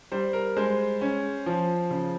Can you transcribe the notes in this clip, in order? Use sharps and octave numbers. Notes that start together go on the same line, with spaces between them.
G3 C5
A#4
G#3 C5
C#4
F3
C#3